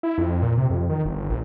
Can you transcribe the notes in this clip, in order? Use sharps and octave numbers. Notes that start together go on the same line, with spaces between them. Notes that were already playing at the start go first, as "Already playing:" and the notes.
E4
F2
A#2
C3
F2
D#3
G1
A#1